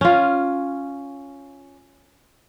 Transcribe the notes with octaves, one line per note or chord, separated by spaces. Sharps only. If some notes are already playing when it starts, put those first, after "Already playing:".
C#4 F4